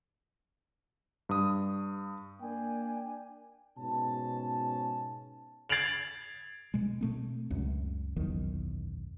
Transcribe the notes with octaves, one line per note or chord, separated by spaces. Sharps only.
G2 D#6
A#3 D4 G5 G#5
G#2 B2 C#4 A5
G#6 A6 C7 D7 F7 F#7
B2 G#3
B2 A3 C4
C#2 F#2
F#1 B1 E2 D#3